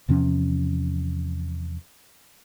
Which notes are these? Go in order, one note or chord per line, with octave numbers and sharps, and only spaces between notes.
E2 C3 F3 C#4